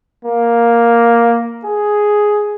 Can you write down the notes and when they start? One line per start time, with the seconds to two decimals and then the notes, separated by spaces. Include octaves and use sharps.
0.25 A#3
1.65 G#4